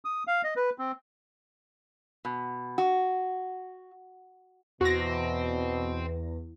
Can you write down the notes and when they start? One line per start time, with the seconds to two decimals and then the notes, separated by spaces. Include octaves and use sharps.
0.05 D#6
0.27 F5
0.44 D#5
0.56 B4
0.78 C4
2.25 B2
2.78 F#4
4.81 E2 B2 C4 F#4 A#6